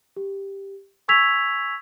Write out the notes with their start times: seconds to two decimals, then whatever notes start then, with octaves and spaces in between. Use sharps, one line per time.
0.16 G4
1.08 G#5 C#6 E6 G#6 B6 F7